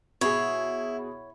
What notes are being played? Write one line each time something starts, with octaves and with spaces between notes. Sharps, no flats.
B2 E4 G#4 C#5